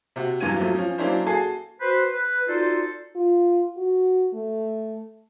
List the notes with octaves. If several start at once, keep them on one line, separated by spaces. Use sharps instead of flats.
C3 F#4
E2 G2 F#3 A#3 G#6 D#7
F3 F#3 A3
F3 C#4
F#3 A#3 C#4 D4 E4 C5
F#4 G#4 A4 G#5 C7
F#4 B4 C5
B4
D#4 F4 F#4 A4 C5 D5
F4
F#4
A3